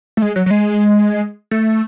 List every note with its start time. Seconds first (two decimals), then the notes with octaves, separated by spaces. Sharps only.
0.17 A3
0.22 G#3
0.36 F#3
0.46 F#3
0.51 G#3
1.51 A3